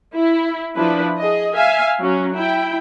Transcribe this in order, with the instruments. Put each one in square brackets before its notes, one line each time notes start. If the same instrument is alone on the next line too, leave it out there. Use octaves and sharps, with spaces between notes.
[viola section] E4
F3 D4 E4 B4
G#4 D#5
E5 F5 G#5
F#3 C#4
E4 G5